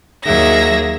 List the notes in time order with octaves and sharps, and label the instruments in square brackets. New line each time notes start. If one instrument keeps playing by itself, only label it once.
[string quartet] D#2 F#3 G#4 E5 A#6